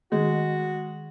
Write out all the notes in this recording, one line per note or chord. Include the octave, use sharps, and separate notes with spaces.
D#3 G#3 F#4